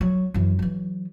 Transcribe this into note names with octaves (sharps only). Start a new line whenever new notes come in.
F#3
F#2 E3
E3 F#3